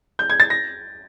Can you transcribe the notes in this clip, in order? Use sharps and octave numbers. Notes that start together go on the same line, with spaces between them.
G6
G#6
A6
A#6